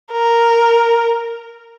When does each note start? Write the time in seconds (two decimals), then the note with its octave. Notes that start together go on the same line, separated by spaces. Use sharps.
0.12 A#4